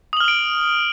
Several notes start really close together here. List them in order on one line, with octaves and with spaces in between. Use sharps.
D#6 F#7 F6 F7 D7